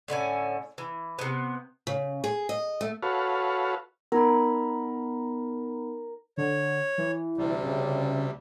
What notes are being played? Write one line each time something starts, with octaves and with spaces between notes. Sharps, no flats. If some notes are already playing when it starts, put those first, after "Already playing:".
A2 D3 C#4 G#5
E3
C3 B3
C#3
G#4
D#5
A3
F#4 A4 B4 C#5 F5
B3 D#4 A#4 B5
D3 C#5
E3
D2 C3 G3
C#3